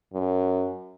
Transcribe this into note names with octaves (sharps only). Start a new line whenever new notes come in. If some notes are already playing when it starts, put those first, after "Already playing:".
F#2